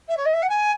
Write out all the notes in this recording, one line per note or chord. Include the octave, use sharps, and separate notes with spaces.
E5
C#5
D#5
E5
F#5
G#5